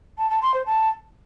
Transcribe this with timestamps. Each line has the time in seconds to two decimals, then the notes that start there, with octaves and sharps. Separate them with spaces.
0.18 A5
0.30 A5
0.42 C6
0.54 C5
0.66 A5